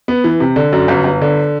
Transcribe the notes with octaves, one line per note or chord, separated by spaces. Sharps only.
B3
E3
C3
D3
F#2
G1
G1
D3